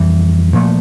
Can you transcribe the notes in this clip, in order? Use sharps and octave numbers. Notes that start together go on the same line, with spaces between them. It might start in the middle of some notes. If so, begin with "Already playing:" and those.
Already playing: F2 E3 G3
A#2 F3 A3